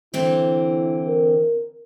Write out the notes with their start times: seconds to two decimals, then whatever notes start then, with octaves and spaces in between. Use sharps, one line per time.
0.14 D3 E3 C4 E4
1.07 A#4